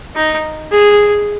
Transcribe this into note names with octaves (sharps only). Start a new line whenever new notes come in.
D#4
G#4